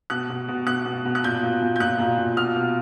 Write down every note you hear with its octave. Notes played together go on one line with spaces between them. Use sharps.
B2 F#6
B2
B2
B2 F#6
B2
B2
F#6
A#2 G6
A#2
A#2
G6
A#2 F#6
A#2
A#2
B2 F6
B2